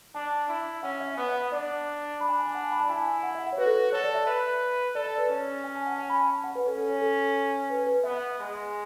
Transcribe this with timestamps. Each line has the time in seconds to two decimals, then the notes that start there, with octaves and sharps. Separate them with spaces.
0.15 D4 A5
0.49 E4
0.83 C#4 F#5
1.00 E5
1.17 B3 E5
1.29 F#5
1.40 F#5
1.52 D4 D5
2.20 D4 B5
2.29 G#5
2.38 A5
2.46 G#5
2.55 F#5
2.63 A5
2.72 B5
2.80 A5
2.89 E4 G#5
3.23 F#5
3.35 E5
3.46 F#5
3.53 C#5
3.58 F#4 B4
3.66 A4
3.76 B4
3.92 A4 C#5
4.04 D5
4.15 E5
4.26 B4
4.95 A4 D5
5.06 D5
5.18 B4
5.30 C#4 C#5
5.64 G#5
5.75 A5
5.87 F#5
5.98 G#5
6.10 B5
6.21 A5
6.44 F#5
6.55 B4
6.66 C#4 A4
6.78 A4
6.89 C#5
7.01 A4
7.70 B4
7.87 B4
8.04 B3 E5
8.39 G#3